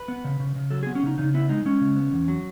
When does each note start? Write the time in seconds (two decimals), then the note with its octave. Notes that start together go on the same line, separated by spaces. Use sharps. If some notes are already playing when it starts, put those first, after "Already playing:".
Already playing: B4
0.08 B3
0.24 C#3
0.40 C#3
0.56 C#3
0.70 F#3 A4
0.83 G#4
0.87 B3
0.95 C#4
1.03 C#3 D#4
1.18 C#3 D#4
1.34 B3 E4
1.49 G#3 D#4
1.65 G#3 C#4
1.81 C#3
1.96 B3
2.13 E2
2.28 F#3